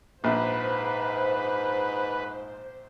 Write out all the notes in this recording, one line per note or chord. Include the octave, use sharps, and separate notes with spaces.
A#1 G#2 B4 C5